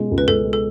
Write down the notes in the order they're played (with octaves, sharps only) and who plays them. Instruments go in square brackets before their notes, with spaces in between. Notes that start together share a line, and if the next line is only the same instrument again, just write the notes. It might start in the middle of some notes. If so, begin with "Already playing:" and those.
Already playing: [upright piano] B2 G#3 C#4
C#2
[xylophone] B4
[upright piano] C#2 [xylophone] A4
[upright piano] G#3
[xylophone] A4